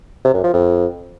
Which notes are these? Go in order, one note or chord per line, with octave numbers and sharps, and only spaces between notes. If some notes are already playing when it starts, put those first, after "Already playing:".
C3
F#2
F3
F2